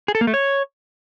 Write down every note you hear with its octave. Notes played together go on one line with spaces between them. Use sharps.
G#4
A4
A#3
A3
C#5